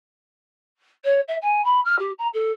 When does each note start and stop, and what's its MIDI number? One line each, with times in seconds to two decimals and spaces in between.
1.04 1.20 73
1.28 1.36 76
1.41 1.61 80
1.64 1.80 83
1.85 1.98 89
1.99 2.11 67
2.18 2.27 82
2.33 2.51 69